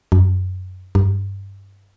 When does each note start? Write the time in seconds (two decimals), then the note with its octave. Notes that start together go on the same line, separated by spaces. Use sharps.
0.12 F#2
0.95 G2